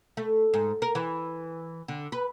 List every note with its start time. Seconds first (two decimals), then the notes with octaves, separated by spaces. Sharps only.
0.17 A3
0.54 G#2
0.82 A#4
0.95 E3
1.88 D3
2.12 B4